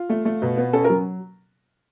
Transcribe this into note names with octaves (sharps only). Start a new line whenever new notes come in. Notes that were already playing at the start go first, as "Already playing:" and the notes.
Already playing: F4
A3
A3
B2
B3
C#4 A4
A#4
F#3